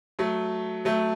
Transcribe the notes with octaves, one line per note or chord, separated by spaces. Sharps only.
F#3 A3
F#3 A3